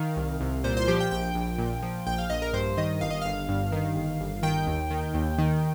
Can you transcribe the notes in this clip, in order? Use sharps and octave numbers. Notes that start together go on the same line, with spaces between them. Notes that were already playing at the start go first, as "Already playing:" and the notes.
Already playing: D#3 F5
C2
C2
A#2 C5
C5
F3 G4
G5
A#1 G5
A#1
A#2
F3
A#1 G5
F5
A#1 D#5
A#4
G2 C5
D#3 D#5
G1 F5
D#5
G1 F5
G2
D#3
G1
G1
D#3 G5
D#2
D#3
D#2
D#3